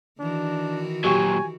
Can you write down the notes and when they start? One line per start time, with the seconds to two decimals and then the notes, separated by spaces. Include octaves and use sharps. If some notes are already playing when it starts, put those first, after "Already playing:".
0.20 D#3 E3 D4 F#4
1.04 A#2 F#3 G4 G#5 C#6